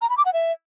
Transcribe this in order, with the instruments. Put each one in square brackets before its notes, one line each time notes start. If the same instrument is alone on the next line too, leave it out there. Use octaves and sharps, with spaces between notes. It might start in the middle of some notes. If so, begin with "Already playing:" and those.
[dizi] A#5
B5
D6
F#5
E5